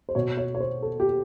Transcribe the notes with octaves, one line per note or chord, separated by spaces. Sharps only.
C5
B2 C#5
C#5
C#5
C5
A4
G4